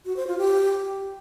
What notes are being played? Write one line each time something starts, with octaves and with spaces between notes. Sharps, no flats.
F#4
C5
F4
G4